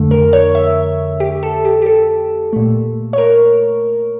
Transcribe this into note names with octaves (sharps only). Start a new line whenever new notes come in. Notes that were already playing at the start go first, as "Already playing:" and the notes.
Already playing: F2 D3 A3
A#4
C#5
E5
G4
A4
G4
G4
A4
A#2 A3
C#5
A#4